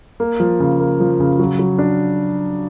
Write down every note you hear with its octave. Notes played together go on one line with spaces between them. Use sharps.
A#3
F3
C#3
A#3
F3
C#3
F#3
F#3
D4